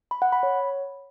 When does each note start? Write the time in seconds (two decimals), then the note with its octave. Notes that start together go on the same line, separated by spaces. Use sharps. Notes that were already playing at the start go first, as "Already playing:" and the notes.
0.11 B5
0.22 F#5
0.32 B5
0.43 C#5